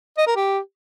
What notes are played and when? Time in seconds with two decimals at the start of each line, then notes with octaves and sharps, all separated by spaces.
0.18 D#5
0.27 A#4
0.36 G4